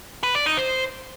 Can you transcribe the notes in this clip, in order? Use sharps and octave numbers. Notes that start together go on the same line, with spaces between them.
B4
D5
D#4
C5